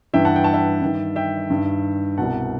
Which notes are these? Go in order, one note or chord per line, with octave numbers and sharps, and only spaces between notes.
G2 E3 E5 G5
F#5 A5
G5
A5
E5 G5
G2 D#3
E5 G5
G2 D#3
C2 B2 F#5 A5